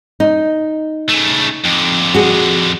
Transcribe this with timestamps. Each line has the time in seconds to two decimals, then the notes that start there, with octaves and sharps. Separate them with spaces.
0.20 D#4
1.09 C#3 A3
1.64 F2 D3
2.15 F#4 G#4